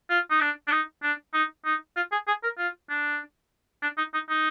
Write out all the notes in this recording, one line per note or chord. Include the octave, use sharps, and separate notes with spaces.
F4
D#4
D4
D4
D#4
D4
D#4
D#4
F4
G#4
G#4
A#4
F4
D4
D4
D#4
D#4
D#4